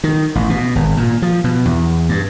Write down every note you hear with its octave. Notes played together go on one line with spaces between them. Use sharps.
D#3
A1
B2
G#1
A#2
F3
B2
E2
G2